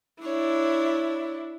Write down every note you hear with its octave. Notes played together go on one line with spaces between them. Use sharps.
D4 E4 C#5